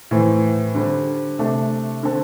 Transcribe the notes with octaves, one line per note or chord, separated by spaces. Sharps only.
A2 E3 C4
D3 G3 C4
C3 A3 D4 A4
D3 C4 A4